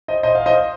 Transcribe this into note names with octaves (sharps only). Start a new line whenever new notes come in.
C5 D#5
C5 D#5
F5
C5 D#5